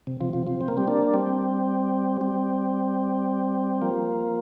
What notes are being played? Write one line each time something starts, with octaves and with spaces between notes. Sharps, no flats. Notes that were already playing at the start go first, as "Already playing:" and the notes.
C3
C3 F3
C3 F3
C3 F3
C4
A#3
G3 C4
A#3 D4
G3 C4
G3 C4
F3 A#3